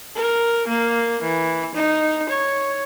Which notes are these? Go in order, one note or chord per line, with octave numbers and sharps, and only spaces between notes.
A#4
A#3
E3
D#4
C#5